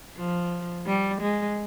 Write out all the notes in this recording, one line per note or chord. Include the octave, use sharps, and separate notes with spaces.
F3
G3
G#3